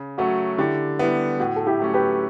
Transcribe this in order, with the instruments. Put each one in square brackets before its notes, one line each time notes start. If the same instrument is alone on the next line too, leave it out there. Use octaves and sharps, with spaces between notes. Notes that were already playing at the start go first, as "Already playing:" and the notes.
Already playing: [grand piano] C#3
[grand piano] F#3 A3 C#4 [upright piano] F#4
[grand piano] D3 [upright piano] E4 G4
[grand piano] G3 B3 [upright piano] E4
[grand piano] A2 [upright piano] F#4
[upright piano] A4
E4 G4
[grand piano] F#3 A3 C#4
[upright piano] G4 B4